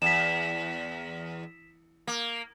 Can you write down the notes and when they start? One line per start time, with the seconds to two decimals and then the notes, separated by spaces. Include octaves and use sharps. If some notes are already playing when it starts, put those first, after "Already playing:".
0.02 E2 B6 E7
2.07 A#3